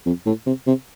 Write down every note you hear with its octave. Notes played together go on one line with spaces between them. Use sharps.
F2
A2
C3
C3